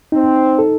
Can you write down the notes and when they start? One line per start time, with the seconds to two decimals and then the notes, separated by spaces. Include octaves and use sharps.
0.12 C4 D#4
0.59 A4